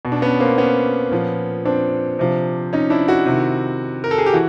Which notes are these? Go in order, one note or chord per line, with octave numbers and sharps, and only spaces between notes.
B2
D4
B3 C#4
A#3 C4
B3 C#4
A#2 F3
C4 D4
C3 F3
C#4 D#4
D4 E4
E4 F#4
C3 D#3
A#4
A4
G#4
G4
E3 F#4